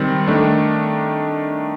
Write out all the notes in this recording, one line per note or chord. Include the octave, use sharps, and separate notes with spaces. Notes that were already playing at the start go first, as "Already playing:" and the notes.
Already playing: D#3 G3 C4
D#3 A3 D4